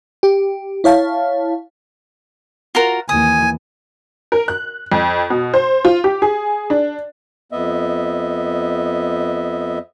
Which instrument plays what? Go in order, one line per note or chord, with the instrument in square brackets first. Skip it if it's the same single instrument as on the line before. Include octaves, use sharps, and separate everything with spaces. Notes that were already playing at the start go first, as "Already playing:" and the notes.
[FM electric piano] G4
E4 C#5 F5 A5
[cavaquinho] F4 F#4 A#4
[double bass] D#2 E3 [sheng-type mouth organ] G#5 [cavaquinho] D#6
[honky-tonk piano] A#4
F#6
F2
B2
C5
F4
G4
G#4
D4
[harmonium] F2 B3 D#5 E5